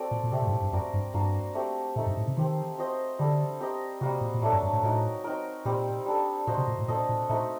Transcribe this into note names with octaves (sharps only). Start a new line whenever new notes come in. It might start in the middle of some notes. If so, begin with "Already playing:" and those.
Already playing: C4 F#4 A4 D5
A#2
A#2
C3 A3 C4 G4 D5
A#2
G2
A2
G2
F#2 C4 F#4 A#4 D5
G2
G2 A#3 D4 F#4 A#4
A3 C4 G4
A#2 A3 D#4 A4
G2
A2
C3
D#3 C4 G4 C5
C4 F#4 C5 D#5
D3 G3 D4 A4
C4 G4 A#4 D#5
C3 G3 A#3 F#4
A#2
A#2
A2 F#3 A3 D4 A4
G2
G2
A2
A2 D#4 F#4 A#4
C4 D#4 F#4 A#4
A#2 G3 C4 G4
G3 D4 A4
A#2 A#3 F#4 C5 D#5
C3
A#2
A2
A#2 D4 A4 C5 D#5
A#2
A#2 A3 D#4 F#4 C5